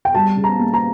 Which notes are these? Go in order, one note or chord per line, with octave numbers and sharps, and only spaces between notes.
G5
G3 A5
C#3
A#5
A#3
A#5